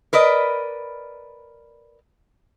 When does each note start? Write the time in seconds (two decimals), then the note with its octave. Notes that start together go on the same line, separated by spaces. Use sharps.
0.13 A#4 B4 D5 D#5